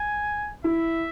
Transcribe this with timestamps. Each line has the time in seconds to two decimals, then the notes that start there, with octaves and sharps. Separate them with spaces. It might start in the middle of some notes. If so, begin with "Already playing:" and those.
Already playing: G#5
0.64 E4 E5